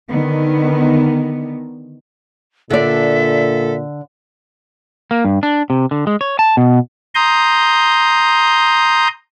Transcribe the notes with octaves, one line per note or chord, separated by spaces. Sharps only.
D3 D#3 B3
A#2 D3 A4 D5 E5
A#3
G2
D4
C3
D3
G#3
C#5
A5
B2
A#5 C6 D#6 G6